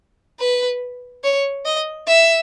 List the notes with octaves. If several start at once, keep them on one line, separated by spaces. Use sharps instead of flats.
B4
C#5
D#5
E5